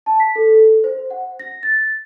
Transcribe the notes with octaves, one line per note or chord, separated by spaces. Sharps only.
A5
B6
A4
C5
F#5
A#6
A6